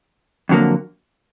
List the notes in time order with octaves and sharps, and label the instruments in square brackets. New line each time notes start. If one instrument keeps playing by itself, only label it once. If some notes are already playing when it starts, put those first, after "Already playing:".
[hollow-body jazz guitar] F2 D3 F#3 A#3